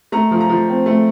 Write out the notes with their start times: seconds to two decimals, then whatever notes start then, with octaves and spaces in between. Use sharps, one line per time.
0.12 A3 A#5
0.31 F3
0.41 A#5
0.49 F3
0.68 C4
0.86 A3